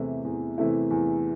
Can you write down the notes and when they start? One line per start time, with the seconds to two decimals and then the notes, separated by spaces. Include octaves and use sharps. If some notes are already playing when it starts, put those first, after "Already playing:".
Already playing: E2 C3 E3 A3 E4
0.25 E2
0.58 C3 E3 A3 E4
0.91 E2